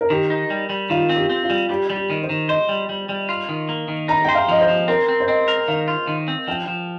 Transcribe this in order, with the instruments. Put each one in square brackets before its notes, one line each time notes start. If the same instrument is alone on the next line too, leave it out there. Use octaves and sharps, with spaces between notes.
[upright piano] A#4
[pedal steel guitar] D#3 [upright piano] G4
[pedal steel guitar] D#4
G3
G3
[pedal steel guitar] D#3 [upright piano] F4
[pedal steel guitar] C4
[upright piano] G4
[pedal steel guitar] C4
[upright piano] F4
[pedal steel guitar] G3
[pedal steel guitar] G3 [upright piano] G4
[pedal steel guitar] G3
[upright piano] G4
[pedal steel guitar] D#3
[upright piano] C5
[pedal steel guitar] D#3
[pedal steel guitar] C5 [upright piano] D#5
[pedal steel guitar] G3
G3
G3
F4
D#3
A#3
D#3
[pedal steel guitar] D#4 [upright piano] A#5
[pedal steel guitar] C5 [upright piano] G5
[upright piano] F5
[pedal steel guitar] F3 [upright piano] D#5
[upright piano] C5
[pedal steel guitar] F3
[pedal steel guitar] C4 [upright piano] A#4
[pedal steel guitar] C4
[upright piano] C5
[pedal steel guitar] C4 [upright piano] D#5
[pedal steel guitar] A#4
[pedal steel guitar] D#3 [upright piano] F5
[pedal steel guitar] F4
D#3
C4
[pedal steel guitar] F3 [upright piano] G5
[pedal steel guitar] F3